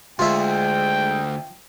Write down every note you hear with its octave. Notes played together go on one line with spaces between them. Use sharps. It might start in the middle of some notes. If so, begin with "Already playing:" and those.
D2 G#3 F4 E5 G5